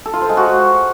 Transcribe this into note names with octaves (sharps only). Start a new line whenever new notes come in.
A4
F4
C5
G#3
F#4